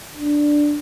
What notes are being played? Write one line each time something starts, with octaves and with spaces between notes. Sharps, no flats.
D4